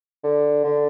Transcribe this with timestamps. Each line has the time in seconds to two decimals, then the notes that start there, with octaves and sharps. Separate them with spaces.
0.24 D3
0.64 D3